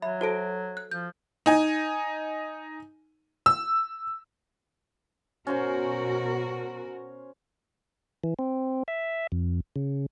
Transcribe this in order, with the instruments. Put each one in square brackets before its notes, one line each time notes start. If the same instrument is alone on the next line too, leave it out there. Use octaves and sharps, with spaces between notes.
[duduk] F#3 [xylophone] E5 [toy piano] B5
[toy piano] F#4 A4 E5 [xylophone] C5 A5 D7
[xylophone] F#6
[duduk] F3 [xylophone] G6
[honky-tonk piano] D#4 G#5
E6
[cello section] B2 F#4 A#4 [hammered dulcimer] C#4 C5 G#5
[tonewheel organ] E3
C4
E5
F2
C#3